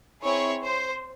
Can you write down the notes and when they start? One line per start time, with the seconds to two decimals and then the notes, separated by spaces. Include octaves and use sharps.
0.22 C4 E4 G#4 C#5
0.62 C5